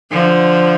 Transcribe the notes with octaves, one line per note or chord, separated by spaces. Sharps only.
D3 F3